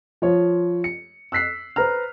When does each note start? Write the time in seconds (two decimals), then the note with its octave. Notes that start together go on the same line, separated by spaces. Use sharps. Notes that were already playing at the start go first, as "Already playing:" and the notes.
0.22 F3 F4 C#5
0.84 C#7
1.32 E6 F#6 B6 C7
1.76 B4 C5 A#5 F6